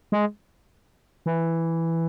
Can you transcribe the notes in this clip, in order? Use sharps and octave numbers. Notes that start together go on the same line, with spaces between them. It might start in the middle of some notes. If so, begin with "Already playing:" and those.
G#3
E3